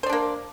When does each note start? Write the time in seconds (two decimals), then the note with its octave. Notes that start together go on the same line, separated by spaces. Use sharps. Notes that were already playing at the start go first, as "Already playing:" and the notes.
0.03 C5
0.06 D5
0.09 D4
0.13 A#3